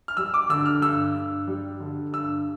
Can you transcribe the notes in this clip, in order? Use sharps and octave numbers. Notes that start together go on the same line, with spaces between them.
F6
G3 E6
D6
D3 E6
F6
G2 E6
G2
G3
D3
G2 E6